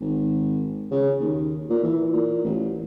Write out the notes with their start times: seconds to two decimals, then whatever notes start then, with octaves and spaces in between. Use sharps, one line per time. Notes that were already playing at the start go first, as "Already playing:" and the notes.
0.01 G#1
0.91 C#3
1.20 D#2
1.70 A#2
1.83 E3
2.13 A#2
2.44 A1